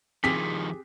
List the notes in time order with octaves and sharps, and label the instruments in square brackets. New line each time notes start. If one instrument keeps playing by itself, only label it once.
[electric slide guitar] D#3 F3 [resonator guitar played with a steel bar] C4 G4 G#4 [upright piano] B6